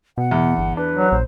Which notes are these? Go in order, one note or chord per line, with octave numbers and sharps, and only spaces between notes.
B2 F#5
E2
G1
D4 B4
F#3
A#1 C5